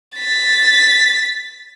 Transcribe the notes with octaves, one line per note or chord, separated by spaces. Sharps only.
A6 B6